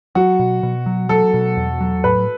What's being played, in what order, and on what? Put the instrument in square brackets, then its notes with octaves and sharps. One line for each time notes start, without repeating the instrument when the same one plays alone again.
[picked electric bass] F#3 [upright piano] F#4
[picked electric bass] B2
B2
F#3
[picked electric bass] F#3 [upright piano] A4
[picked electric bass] B2
E2
F#3
[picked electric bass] A2 [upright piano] B4